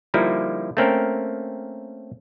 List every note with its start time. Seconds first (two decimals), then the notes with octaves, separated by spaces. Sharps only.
0.14 D3 F3 G3 A#3 D#4 E4
0.77 A3 A#3 C4 C#4 A#4 G5